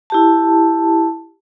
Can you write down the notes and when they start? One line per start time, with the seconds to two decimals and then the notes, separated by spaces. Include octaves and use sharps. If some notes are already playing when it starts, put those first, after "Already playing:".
0.10 E4 G4 A5